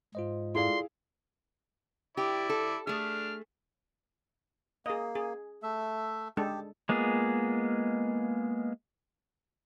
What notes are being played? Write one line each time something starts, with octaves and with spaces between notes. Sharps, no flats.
G#2 F4 C5 D#5
E4 F4 G#4 A4 D5 F5 C6
E4 G4 D5
A4
A3 D4 G#4 F6
A#3 G#4 D#5
G#4
A3 E5
G#3 D4 G4 A4
G#3 A#3 B3 F4 G#4